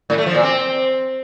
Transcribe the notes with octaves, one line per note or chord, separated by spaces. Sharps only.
A2
A3
F3
A#2
C4